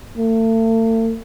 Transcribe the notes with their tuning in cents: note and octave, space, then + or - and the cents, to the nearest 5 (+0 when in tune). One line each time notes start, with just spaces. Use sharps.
A3 +40